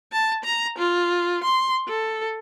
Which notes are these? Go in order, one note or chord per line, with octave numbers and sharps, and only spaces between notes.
A5
A#5
F4
C6
A4